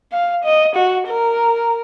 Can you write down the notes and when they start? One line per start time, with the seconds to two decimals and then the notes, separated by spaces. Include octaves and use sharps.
0.12 F5
0.44 D#5
0.76 F#4
1.08 A#4